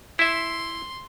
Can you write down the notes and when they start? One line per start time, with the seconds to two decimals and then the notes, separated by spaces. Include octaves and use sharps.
0.19 E4 E5 C6